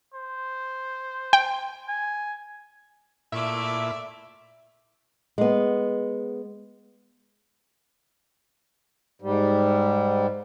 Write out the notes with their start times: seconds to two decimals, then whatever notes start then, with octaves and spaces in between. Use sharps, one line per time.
0.14 C5
1.33 G5
1.88 G#5
3.32 A#2 A3 E4 D5 E5
5.38 G#3 B3
9.22 G#2 G3